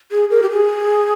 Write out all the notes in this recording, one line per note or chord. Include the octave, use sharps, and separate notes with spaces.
G#4
A#4
G4
G#4